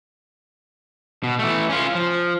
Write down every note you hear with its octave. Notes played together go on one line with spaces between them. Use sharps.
B2
E3 A3
C#4 F4
F3